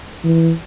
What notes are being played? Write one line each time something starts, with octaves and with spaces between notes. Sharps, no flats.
E3